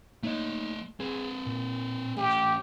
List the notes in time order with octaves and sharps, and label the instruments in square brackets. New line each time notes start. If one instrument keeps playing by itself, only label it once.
[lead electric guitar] A3 D#5 [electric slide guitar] A#3 D#4 C#5
[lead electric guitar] C4 B4 [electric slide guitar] G#4
[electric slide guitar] A#2
[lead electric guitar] A3 C#4 [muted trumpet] G4